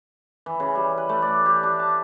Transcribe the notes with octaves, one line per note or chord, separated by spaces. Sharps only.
E3
C#3
G3
B4
A3
D5
G4
D4
A5